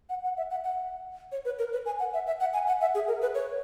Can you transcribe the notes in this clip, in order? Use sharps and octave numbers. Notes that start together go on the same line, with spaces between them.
F#5
F#5
E5
F#5
F#5
C#5
B4
A#4
B4
G#5
F#5
E5
E5
F#5
G#5
F#5
E5
G#4
A#4
B4
C#5